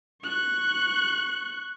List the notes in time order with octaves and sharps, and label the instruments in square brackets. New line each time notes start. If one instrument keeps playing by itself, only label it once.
[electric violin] C#6 F#6